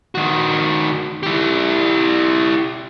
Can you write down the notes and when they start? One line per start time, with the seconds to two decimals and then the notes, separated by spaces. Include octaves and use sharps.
0.15 D#3 F#4
1.23 E4 G4